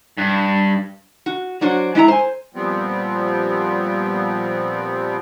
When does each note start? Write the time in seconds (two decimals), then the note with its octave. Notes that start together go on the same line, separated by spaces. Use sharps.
0.17 G2
1.26 F#4
1.61 F#3 D4 F#4 C5
1.95 G#3 E4 A5 A#5
2.08 C5 G#5
2.55 A#2 F3 G3 B3 C4